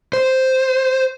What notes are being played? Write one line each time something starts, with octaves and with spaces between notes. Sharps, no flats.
C5